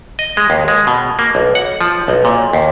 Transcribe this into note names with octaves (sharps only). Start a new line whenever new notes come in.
D#5
G#3
D#2
G#3
B2
A#3
B1
F#5
F3
B1
A#2
D#2